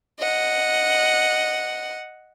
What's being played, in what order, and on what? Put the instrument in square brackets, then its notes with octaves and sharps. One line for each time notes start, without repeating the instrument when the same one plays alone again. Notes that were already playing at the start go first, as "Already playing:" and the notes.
[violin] D#5 F#5